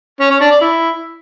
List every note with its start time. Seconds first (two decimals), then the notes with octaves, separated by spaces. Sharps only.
0.21 C#4
0.31 C#4
0.41 D4
0.51 D5
0.61 E4